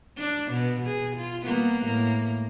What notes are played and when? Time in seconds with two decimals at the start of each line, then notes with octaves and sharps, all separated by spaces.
0.18 D4
0.51 B2
0.81 B2 G#4
1.16 F4
1.45 G3 A#3 B3
1.83 A2 A#3